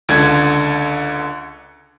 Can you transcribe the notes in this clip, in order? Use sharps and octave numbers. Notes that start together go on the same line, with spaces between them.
C#2 D3 G#6